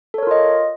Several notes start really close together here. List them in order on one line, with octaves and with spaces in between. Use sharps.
A4 C#5 A#4 F4 D#5